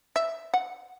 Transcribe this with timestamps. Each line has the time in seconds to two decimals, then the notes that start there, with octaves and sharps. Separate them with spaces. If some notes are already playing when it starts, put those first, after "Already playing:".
0.16 E5
0.54 F#5